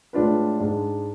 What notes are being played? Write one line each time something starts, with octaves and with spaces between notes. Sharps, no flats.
A2 G#3 D4 F4 B4
G#2 G#3 D4